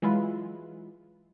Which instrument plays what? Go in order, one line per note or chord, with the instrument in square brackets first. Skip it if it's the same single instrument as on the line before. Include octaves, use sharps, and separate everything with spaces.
[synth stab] E3 F#3 G#3 E4 F4 B4